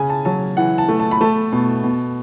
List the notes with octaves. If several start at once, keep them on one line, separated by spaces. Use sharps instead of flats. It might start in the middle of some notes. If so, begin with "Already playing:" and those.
Already playing: C#3 G#5
A5
F#3 A5
E3 F#5
A5
A3
A5
B5
A3 A5
B2
B2